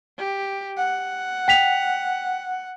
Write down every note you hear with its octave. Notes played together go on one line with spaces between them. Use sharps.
G4
F#5
G5 B6 F7